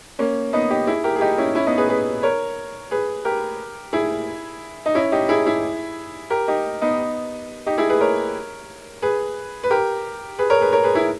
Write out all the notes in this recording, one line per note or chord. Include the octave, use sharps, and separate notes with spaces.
A#3 C#4
B3 D#4
D#4 G4
E4 G#4
G4 A#4
G#4
D#4 G4
C#4 E4
C#4 E4
B3 D#4
G#4 B4
G#4 B4
A#4 C#5
G#4 B4
G4 A#4
E4 G#4
D#4
C#4 E4
D#4 G4
E4 G#4
E4 G#4
G4 A#4
D#4 G4
B3 D#4
D#4 G4
E4 G#4
G#4 B4
A#4 C#5
G#4 B4
B4
G4 A#4
G#4 B4
A#4 C#5
G#4 B4
A#4 C#5
G#4 B4
E4 G#4